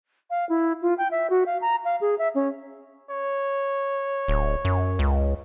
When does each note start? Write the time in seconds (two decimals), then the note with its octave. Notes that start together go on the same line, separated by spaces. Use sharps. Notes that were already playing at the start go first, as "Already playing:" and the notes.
0.30 F5
0.49 E4
0.82 F4
0.98 G5
1.11 E5
1.30 F#4
1.46 F5
1.62 A#5
1.85 F5
2.01 G#4
2.18 E5
2.35 C#4
3.10 C#5
4.28 D1
4.65 F#2
4.99 C#2